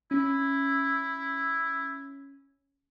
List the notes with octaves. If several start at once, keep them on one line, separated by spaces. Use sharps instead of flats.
C#4 E4